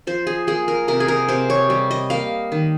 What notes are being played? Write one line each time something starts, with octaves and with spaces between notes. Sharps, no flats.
F3 C5
G#4
A#3 G#4
A#4
C3 A#4
G#4
A#4
C3 C5
C#5
G3
D#5
A#3 F5
D#3